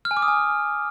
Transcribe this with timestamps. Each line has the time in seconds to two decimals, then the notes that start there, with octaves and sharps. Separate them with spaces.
0.05 F6
0.11 G#5
0.17 D6
0.22 D#6
0.28 G#5